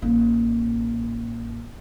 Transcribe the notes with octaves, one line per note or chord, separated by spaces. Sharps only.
A1 A#3